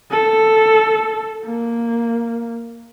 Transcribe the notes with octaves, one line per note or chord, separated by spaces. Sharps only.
A4
A#3